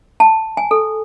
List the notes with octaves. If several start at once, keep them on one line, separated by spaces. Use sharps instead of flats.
A5
G#5
A4